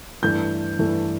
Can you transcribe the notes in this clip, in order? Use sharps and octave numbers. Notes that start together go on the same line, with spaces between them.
G2 E3 A3 G6
G2 E3 A3